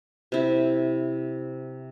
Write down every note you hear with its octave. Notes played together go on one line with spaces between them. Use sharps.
C3 E4